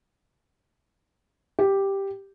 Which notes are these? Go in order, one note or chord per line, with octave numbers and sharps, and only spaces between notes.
G4